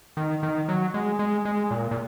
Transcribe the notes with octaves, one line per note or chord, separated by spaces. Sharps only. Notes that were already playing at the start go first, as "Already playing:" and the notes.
D#3
D#3
F#3
G#3
G#3
G#3
A#2
A#2